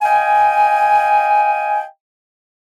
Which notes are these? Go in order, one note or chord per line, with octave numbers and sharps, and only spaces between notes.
D#5 F5 G5 G#5